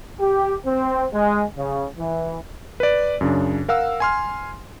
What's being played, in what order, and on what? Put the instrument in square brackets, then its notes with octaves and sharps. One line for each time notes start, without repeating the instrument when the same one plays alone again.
[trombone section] G4
C4
G#3
C#3
E3
[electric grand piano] B4 D5
F#2 C#3 D4
A#4 F5 F#5 E6
G#5 C6 F6